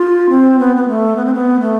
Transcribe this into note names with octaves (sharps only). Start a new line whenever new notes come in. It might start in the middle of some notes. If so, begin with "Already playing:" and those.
Already playing: F4
C4
B3
B3
A3
B3
C4
B3
A3